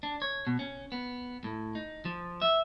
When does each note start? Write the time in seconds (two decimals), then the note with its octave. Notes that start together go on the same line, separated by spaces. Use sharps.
0.03 D4
0.22 C#5
0.47 B2
0.59 C#4
0.92 B3
1.44 A2
1.75 D#4
2.05 F3
2.42 E5